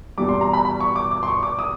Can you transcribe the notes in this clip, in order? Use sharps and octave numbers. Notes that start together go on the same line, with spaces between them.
E2 B2 G3 D6
C6
A#5
B5
B5
C#6
D6
D6
C6
C#6
D6
D#6